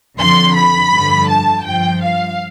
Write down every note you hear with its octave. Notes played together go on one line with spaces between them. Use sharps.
F2 D3 F3 C6
B5
G2 D3 F3
A5
G2 F3 G5
F5